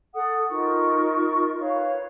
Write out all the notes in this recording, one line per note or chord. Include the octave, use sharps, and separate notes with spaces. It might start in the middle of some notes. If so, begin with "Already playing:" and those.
A4 F#5 D#6
D#4 F4 A#4 C#6
B4 C#5 F5